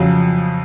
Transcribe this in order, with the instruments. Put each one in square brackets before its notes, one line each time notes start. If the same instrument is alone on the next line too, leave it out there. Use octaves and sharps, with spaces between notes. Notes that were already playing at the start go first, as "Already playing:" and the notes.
Already playing: [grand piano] F2 C#3 F#3